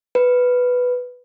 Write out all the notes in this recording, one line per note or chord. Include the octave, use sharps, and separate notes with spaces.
B4